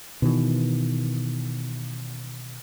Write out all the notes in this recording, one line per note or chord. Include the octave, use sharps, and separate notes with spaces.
B2 D#3 E3